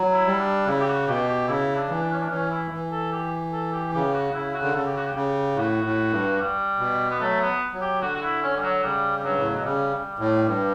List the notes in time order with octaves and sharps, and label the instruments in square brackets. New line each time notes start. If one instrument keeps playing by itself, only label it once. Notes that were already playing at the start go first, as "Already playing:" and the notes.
Already playing: [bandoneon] F#3
[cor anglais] E4
[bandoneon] G3
[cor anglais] D4
[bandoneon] C#3 [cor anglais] E4
[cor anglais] G4
F#4
[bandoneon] B2 [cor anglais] G4
[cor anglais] G4
[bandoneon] C#3 [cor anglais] E4
[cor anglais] D4
[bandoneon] E3
[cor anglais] D4
C#4
D4
[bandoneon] E3 [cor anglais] C#4
[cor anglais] E4
[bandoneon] E3
[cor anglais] A4
G4
A4
G4
[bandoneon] C#3 [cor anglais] G4
[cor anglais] F#4
[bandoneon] C#3 [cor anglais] E4
[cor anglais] F#4
[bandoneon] D3
[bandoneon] C#3 [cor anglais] A4
[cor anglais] G4
F#4
G4
[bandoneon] C#3
[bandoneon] A2 [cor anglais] F#4
[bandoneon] A2
G2
[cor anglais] G3
[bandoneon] B2
[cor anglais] B3
[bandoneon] F#3 [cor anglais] A3
[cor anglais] B3
[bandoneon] F#3
[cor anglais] G4
[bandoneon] D3 [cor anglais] F#4
[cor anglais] F#4
E4
C#4
G3
F#3
[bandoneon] C#3 [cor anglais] G3
[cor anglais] G3
[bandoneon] G2 [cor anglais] F#3
[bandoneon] A2
[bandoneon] B2 [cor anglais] F#3
[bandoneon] C#3 [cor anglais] G3
[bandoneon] A2
G2